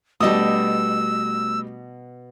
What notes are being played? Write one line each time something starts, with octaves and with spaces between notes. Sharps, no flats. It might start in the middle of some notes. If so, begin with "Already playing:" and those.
B2 G3 A3 D4 D#5 D#6 E6